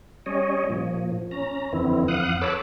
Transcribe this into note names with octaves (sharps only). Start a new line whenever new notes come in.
G3 C#4 C#5 D#5
A#2 F3
C#4 A#5
F2 D3 E3 B3 C4 E4
F2 F5 F#5 D#6 F#6
A4 B4 C#5 D6 E6 F#6